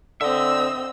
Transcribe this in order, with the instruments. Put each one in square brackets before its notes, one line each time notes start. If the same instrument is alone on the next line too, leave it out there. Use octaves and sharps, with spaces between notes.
[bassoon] D3 [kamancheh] C4 E6 [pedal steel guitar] D#5 E5